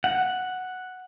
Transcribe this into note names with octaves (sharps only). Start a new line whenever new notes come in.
F#5